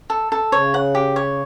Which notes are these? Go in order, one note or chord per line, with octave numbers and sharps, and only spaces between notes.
A4
A4
C#3 C#5
F#5
G4
C#5